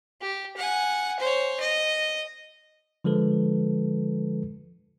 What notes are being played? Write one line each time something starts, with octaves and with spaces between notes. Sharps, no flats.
G4
F#5 G#5
C5 C#5
D#5
D3 F3 G#3 A4 B4